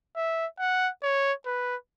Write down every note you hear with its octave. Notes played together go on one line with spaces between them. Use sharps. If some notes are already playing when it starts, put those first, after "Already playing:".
E5
F#5
C#5
B4